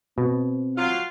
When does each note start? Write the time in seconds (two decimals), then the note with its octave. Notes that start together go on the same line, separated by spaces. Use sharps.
0.18 B2 C4
0.77 F#3 F4 F5